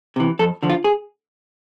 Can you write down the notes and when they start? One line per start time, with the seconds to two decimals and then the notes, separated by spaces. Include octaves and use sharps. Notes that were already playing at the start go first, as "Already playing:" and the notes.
0.16 C3 E3
0.39 F2 A4
0.63 D3 F3
0.70 F4
0.84 G#4